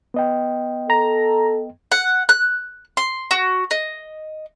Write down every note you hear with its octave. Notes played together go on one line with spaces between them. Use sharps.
B3 D#5 G5
A4 A#5
F#5
F#6
C6
F#4
D#5